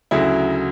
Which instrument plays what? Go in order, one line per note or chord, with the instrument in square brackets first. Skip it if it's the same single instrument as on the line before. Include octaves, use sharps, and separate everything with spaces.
[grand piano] D2 C#3 F#3 E4